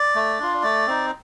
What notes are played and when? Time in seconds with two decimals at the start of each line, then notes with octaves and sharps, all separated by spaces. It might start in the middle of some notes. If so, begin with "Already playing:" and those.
Already playing: D5
0.15 A3
0.39 D4 F4
0.63 A3 D5
0.87 C4 D#4